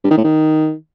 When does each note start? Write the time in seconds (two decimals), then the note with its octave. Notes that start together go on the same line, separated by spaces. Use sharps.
0.04 G2
0.11 D#3
0.17 A2
0.24 D#3